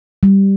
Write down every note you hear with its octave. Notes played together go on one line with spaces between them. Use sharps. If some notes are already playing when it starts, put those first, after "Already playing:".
G3